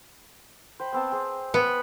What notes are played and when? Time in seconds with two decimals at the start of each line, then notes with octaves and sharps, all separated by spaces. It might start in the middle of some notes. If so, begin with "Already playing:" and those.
0.80 C5 G5 B5
0.92 B3 C4 A5
1.12 C4 G#4
1.54 B3